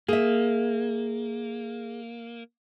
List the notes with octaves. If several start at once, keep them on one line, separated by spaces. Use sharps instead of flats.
A#3 G#4 E5